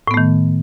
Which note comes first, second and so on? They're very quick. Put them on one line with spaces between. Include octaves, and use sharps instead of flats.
A2 B3 A3 D#3